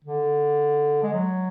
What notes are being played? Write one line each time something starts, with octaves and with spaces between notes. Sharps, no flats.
D3
G#3
F#3